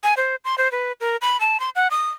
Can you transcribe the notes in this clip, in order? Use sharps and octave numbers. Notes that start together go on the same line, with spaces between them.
G#5
C5
C6
C5
B4
A#4
B5
A5
C6
F#5
D#6